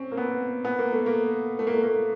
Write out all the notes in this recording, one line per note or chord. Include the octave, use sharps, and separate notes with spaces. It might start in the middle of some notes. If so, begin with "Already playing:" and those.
Already playing: C4 C#4
A#3
B3
B3
A#3
A3
A#3
A3
A#3
A3
A#3